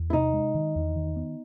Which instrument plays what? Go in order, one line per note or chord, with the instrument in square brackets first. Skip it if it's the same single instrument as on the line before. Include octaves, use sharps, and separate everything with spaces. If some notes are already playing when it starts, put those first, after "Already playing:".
Already playing: [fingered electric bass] E2
[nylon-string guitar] E4
[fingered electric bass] C3 [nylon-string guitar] D#4
[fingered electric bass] G#3
D#3
E2
D#3
B3